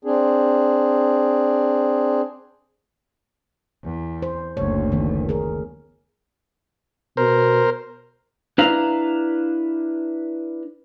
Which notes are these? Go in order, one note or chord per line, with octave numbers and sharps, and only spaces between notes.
C4 D4 G#4
E2
C5
F#1 D2 C#5
D#3 B3
G#4 A#4
B2 A#4 C5
D4 E4 B4 F5 A#5